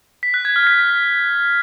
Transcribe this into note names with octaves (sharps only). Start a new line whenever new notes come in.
B6
F#6
G#6
F6
B6